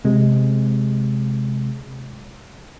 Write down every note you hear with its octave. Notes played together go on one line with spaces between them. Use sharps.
C3 G#3